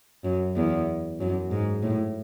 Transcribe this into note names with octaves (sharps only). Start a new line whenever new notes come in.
F#2
E2
F#2
G#2
A2